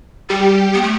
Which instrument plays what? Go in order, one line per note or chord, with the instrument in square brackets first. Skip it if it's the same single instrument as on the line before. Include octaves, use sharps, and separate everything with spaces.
[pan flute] G3 [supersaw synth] G4
[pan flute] B3
A3